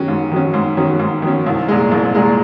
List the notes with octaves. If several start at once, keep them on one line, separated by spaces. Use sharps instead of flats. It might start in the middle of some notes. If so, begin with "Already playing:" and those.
Already playing: D#3 F#3 C#4
G#2
D#3 F#3 C#4
G#2
D#3 F#3 C#4
G#2
D#3 F#3 C#4
C2
A#2 G#3
C2
A#2 G#3